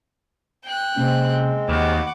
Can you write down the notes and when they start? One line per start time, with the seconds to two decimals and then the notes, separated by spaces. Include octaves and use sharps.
0.64 G5 F#6
0.96 C3 G#3 A#3 C4 C#4
1.69 D#2 F#5 B5 C#6 D6